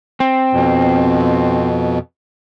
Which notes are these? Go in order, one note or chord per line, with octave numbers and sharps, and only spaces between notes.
C4
F2 B2